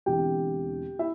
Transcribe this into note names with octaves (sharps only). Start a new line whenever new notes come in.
E1 E2 D3 C4 E4 G4 G5
E4 E5